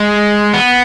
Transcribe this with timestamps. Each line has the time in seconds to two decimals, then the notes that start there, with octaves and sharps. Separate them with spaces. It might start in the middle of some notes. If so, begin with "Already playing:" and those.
Already playing: G#3
0.54 B3